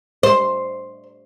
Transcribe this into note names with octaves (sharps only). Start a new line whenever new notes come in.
C5